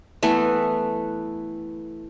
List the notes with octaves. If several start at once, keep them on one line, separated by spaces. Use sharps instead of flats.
E3 A3 B3